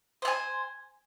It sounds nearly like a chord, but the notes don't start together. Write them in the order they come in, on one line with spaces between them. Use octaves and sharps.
C5 A5 G#5